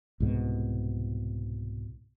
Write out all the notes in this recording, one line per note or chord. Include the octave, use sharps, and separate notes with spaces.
C2 G#2 B2